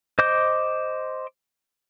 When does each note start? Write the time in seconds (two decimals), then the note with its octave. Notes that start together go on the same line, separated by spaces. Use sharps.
0.19 C5 D#5 D6 G6